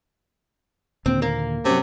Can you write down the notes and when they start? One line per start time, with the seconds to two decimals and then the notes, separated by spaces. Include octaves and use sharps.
1.06 D#2 A#2 D3 C4
1.22 A#3
1.65 C3 F#3 C#4